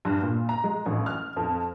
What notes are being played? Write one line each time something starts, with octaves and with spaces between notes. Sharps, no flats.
G2
A#2
A#5
G#3
A1
F6
F2